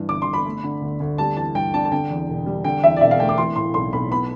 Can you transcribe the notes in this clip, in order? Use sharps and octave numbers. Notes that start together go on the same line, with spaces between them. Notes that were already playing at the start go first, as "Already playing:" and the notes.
Already playing: G2 E3
G1 D6
C6
G1
B5
A3
D3
D2
D2
G3 A5
E3 A5
G2 G5
D4 A5
A5
D3 G5
E2
E1
G3
D3 G5
E2 E5
D5
E1 E5
F5
A3 G5
D6
E3 C6
A2 C6
B1 C6
B1 B5
B3 B5